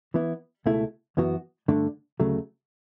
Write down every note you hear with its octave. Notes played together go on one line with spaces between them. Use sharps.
E3 B3 E4
C#2 B2 A3 E4
F#2 E3 B3 F#4
G2 D3 A3 D4
D2 C#3 F#3 A3